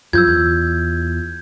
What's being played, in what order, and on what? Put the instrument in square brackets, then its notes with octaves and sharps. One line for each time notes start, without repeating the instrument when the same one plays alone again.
[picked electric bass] F#2 F3 [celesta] F4 E6 [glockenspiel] G6 G#6
[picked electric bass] E2